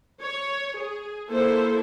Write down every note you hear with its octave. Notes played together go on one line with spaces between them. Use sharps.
C#5
G#4
A#3 E4 A4 C5